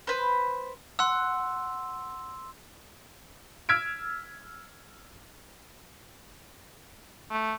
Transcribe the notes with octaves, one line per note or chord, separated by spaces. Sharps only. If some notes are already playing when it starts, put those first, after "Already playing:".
B4 C5
F#5 C6 E6
E6 F6 G#6 B6 D7
A3